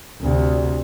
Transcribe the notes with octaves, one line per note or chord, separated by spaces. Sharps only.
D2 C3